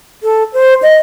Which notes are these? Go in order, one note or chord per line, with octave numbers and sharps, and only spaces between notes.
A4
C5
D#5